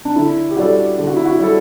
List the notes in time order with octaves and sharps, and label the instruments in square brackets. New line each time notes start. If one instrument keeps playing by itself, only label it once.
[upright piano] D4
[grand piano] D3 [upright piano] E4
[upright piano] G4
[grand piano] G3 D4 A4 [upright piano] F#4
[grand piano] D3 [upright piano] G4
[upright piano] F#4
E4
F#4
[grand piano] G3 D4 A4